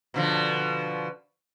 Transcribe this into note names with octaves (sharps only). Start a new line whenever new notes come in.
B2 D3 F3